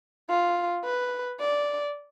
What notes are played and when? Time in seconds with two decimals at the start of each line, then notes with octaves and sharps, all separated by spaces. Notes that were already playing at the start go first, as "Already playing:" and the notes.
0.29 F4
0.84 B4
1.40 D5